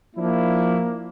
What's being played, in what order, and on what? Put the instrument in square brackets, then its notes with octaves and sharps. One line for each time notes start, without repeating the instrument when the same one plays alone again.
[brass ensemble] F3 D4 E4 [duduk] A#3